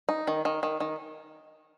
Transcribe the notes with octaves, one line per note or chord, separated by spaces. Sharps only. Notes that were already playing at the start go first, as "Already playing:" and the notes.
D#4
D#3
D#3
D#3
D#3